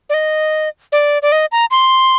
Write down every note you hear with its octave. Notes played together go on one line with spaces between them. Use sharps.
D5
D#5
D5
D5
D#5
A#5
C6